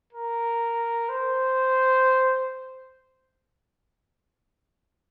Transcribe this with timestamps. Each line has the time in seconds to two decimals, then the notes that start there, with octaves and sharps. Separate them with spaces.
0.13 A#4
1.09 C5